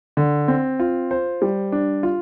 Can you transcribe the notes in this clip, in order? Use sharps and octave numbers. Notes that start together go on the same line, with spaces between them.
D3
C4
F4
C5
G3
D4
F4